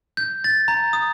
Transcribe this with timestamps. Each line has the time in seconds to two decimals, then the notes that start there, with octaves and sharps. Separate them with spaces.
0.17 G6
0.44 A6
0.68 A#5
0.93 D#6